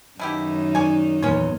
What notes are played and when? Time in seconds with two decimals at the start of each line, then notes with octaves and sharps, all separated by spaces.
0.20 F#2 B2 D#3 D#4 E4 G4
0.75 C#5 D5 G#5
1.22 E2 A#2 C#4 F4 C#5